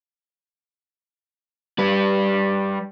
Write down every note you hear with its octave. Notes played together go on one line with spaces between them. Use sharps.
G3 B4